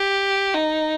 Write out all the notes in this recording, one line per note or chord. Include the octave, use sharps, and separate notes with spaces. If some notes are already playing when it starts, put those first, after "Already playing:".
Already playing: G4
D#4